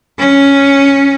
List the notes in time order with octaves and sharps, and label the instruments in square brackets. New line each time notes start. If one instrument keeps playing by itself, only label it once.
[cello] C#4